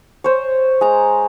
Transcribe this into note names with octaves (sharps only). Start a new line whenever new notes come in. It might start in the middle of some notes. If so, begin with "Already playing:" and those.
C5 C#5
G#3 A#5